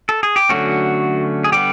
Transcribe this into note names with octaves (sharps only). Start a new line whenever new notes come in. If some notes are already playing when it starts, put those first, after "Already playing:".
A4
G#4
G4
D3 F#3 A3 C#4 F#4
G#4
D3 G3 B3 G4